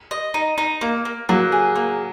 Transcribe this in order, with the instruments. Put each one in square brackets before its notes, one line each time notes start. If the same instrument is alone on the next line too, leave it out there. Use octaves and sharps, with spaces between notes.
[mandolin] D#5
D#4
D#4
A#3
A#3
[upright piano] F#3 [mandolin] A#3
[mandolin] G#4
A#3